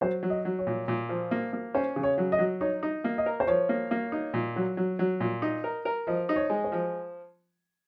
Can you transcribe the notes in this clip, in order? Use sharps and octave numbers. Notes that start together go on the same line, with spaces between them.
F#3 C5
F#3
D#5
F#3
C#5
A#2
A#2
F3
A#3
A#3
C#4 C5
C#3
C#5
F#3
D#5
F#3
D#4 C#5
D#4
A#3
D#5
A#4
C5
F3 C#5
A#3
A#3
D#4
A#2
F#3
F#3
F#3
A#2
D#4
A#4
A#4
F3 D#5
D#4
C#5
G#3
C5
F3